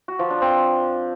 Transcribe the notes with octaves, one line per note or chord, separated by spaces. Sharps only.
F#4
F3
D4
C4